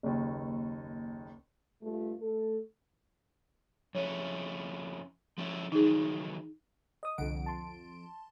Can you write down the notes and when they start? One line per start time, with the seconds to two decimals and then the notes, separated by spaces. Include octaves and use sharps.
0.03 F#1 D#2
1.82 G2 A3 F4
2.20 A3 A4
3.95 F2 C#4 E4 C#5
5.38 F3 C#4 E4
5.72 D#3 E3 F#3 D#4 G#4
7.03 D#5 D#6
7.18 C2 F2 D3 F#5 D7
7.46 A5 C6